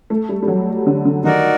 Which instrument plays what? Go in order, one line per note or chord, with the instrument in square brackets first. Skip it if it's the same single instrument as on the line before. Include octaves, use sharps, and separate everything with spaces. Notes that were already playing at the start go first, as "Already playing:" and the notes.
[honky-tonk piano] A3
G3
G3
F#3
D3
D3
[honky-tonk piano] D#3 [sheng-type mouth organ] D#4 F#4 A#4 D5